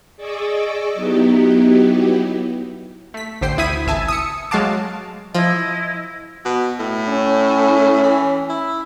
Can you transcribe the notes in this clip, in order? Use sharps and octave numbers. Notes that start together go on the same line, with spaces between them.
G#4 D5 D#5 C#6 D6 E6
F#3 B3 D#4 E4 G4
A3 B6
A1 D3 C5 G5 C7
D2 E4 D#6 G#6 B6 D#7
G#1 C#2 E5 G#5 A5
D#6 E6 C#7
F#3 G#3 F#4 F5 A5 D6
F3 E4 D#5
B2
A2
C#4
E3
E4